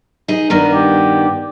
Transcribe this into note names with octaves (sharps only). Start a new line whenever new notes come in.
D#4 G#4
G2 D#3 B3 A#4
G4